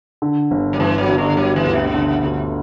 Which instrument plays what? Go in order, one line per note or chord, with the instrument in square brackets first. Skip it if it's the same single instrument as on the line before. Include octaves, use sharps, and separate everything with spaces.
[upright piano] D3
G1
[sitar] F#3
[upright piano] G2 [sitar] E3
[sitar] F#3
[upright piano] G1
[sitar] D3
[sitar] F#3 [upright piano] G3
[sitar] E3
[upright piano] D2
[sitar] B2
[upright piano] D3
D2